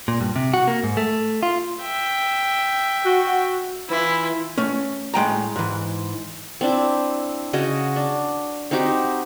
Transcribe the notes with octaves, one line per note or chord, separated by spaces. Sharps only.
A#2
G2
C3
F#4
A#3
G#2
A3
F4
E5 G5
F#4
E3 E4 F4
A3 C#4
A2 G#3 G5 A#5
G#2 E3
C4 D4 E4
C#3 F#4 D#5
D4
C4 D#4 F#4 G4